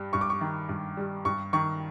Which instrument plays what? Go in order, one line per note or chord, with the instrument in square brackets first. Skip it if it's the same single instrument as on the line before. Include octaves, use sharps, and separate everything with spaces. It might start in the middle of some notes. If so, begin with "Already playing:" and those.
Already playing: [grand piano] G2 G3
G2 C#6
D6
C#6
D#3
G2
G3
G2 C#6
D#3 C#6